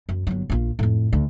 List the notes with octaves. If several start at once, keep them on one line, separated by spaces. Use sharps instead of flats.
F#2
G1 F#3
A#1 F4
F2 A2
D2